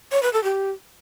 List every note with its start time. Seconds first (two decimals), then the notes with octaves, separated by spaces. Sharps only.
0.12 C#5
0.23 B4
0.33 A4
0.44 G4